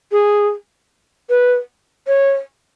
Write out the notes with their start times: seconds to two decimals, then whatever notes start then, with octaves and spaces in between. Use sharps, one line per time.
0.12 G#4
1.29 B4
2.07 C#5